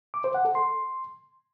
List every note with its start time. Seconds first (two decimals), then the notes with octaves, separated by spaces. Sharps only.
0.14 D6
0.24 C5
0.34 F#5
0.45 A4
0.55 C6